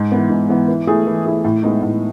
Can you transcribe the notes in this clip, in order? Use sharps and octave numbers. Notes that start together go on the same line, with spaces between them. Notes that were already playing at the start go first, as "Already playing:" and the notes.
Already playing: G#2
E3 B3
G#2
E3 B3
E3
A3 E4 G#4
E3
A3 E4 G#4
A2
G#3 B3 D#4
A2